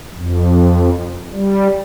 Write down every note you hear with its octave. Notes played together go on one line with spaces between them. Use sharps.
F2
G3